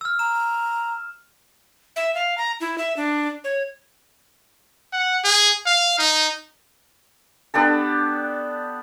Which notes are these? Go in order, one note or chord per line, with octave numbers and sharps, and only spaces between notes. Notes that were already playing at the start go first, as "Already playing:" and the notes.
E6 F6
A#5 E7
E5
F5
A#5
E4
E5
D4
C#5
F#5
G#4
F5
D#4
B3 D4 G4 A4